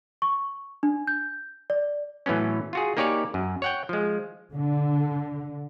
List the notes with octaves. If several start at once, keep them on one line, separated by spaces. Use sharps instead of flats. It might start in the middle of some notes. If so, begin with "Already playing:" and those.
C#6
D4
G6
D5
A2 E3 F#3 B3 C#4
F4 F#4 G#4
A#3 D#4 G4 C#5 D5 G#5
F#2
C#5 F#5 G5
F3 G#3
D3